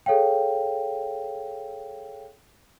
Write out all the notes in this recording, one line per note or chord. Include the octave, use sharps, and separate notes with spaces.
G#4 A4 C#5 F5 G5